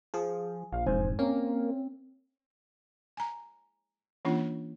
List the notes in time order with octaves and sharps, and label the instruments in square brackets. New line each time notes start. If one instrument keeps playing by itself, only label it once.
[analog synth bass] F3 [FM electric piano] G#4
[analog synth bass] A#1 [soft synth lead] F5
[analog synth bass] E1 [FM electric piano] F2 G#2 G#5 [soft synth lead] C5
[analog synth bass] A#3 [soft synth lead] C4 [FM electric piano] C#4
[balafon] G#5 A#5
E3 A#3 C#4 D4 F4